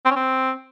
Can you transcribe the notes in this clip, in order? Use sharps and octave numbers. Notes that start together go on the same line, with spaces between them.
C4
C#4
C4